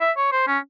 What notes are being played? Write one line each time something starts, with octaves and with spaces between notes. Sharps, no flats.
E5
C#5
C5
C#4